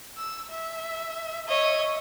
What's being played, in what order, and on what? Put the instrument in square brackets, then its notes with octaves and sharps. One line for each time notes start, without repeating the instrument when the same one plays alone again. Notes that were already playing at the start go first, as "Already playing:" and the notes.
[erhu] E6
E5
[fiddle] C#5 D#5 [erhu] E5